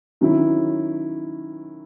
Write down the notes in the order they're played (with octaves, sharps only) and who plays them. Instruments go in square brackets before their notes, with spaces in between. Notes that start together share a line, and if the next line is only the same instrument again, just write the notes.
[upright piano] D#3 F#3 C#4 E4